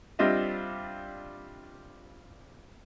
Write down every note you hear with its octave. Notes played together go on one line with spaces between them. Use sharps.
G3 C4 D4 F4 D#5 E5